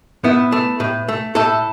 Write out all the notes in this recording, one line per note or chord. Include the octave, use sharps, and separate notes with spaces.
A2 B3 E4
A3
A2
A3
A2 E4 A4